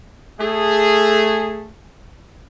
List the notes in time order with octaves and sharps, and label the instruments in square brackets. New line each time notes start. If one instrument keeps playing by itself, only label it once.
[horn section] A3 G#4